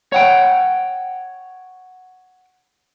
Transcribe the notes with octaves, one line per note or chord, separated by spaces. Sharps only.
C#5 F#5 G5